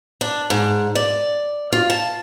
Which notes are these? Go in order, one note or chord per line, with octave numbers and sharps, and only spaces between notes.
D4
G#2
D5
F4
A5